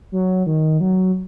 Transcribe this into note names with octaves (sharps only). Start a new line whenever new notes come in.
F#3
D#3
F#3